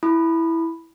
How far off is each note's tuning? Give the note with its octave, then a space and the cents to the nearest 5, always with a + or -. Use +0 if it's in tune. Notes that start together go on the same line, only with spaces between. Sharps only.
E4 +0 B5 +0 D#6 -35